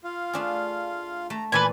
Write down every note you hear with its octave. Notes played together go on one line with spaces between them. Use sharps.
F4 F5
A3 D4 G#4
A3 A#5
A#2 E3 B4 G#5 B5